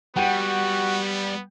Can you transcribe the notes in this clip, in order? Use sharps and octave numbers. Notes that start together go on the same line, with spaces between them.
G3 B3 F#4 F#5 G5 D#7